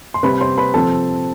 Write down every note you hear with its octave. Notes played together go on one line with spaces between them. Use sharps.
C6
C3 G3 C4 B4 B5
B5
C5 C6
B4 B5
C3 F3 C4 A4 A5